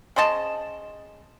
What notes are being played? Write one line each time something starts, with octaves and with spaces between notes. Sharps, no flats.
C#3 C5 D#5 A5